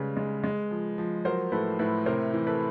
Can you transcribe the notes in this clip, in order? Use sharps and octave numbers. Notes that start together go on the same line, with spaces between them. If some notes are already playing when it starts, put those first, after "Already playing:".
Already playing: C#3 G3 G#3 B4
G#3
G#3
F3
F3
F#3 A#4 C5
A2 A4 B4
A2 A4 B4
C3 A#4 C5
E3
A4 B4